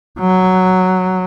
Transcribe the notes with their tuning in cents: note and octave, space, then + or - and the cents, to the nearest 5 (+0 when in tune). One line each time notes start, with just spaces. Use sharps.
F#3 +0